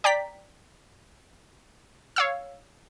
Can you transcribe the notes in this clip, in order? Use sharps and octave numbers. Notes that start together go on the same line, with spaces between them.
D5 G5 A#5 B6
C#5 F5 E6